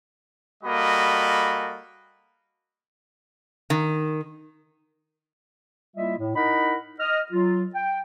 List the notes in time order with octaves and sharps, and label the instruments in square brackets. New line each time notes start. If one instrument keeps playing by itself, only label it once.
[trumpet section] G3 A#3 F#4 A4 D#5 B5
[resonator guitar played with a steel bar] D#3
[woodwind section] G3 A#3 E4 F4 D#5 E5
A2
D#4 E4 A#4 D#5 F#5 B5
D#5 F6
F#3 F4
G5